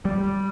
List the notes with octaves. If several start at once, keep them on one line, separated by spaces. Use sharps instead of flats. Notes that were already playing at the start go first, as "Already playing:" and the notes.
G3